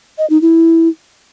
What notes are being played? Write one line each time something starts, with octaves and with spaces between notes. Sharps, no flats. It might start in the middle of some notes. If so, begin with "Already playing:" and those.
D#5
D#4
E4